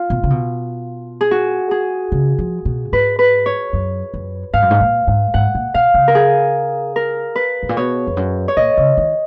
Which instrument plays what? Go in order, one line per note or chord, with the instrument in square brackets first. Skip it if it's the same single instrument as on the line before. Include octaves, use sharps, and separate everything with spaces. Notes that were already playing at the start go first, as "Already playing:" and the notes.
Already playing: [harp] F4
[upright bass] B2
C#3
B2
[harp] G#4
F#4
G#4
[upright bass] C#3
F3
B2
[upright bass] G#2 [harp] B4
[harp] B4
C#5
[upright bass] F#2
F#2
[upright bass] G#2 [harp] F5
[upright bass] F#2
G#2
A#2
G#2
[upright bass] G#2 [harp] F#5
[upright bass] A#2
[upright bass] B2 [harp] F5
[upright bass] C#3
[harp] A#4
G#4
A#4
B4
[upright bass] G#2
A#2
[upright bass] B2 [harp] C#5
[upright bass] F2
F#2
[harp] C#5
[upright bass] A#2 [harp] D#5
[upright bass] C#3
D#3